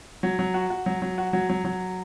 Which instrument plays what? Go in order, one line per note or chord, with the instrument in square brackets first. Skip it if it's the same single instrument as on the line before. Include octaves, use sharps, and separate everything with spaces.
[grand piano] F#3
F#3
F#4
F#4
F#3
F#3
F#4
F#3
F#3
F#3